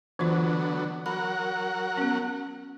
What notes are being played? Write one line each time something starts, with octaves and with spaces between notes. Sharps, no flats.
D3 E3 F#3 B3 F4
F#3 A#4 F#5 B5
B3 C#4